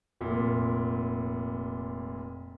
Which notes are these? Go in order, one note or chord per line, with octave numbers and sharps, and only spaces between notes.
F1 A#2